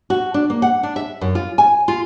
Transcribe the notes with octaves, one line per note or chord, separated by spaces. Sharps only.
F#4
D4
A#3
F#5
D4
E5
F#2
F4
G#5
F4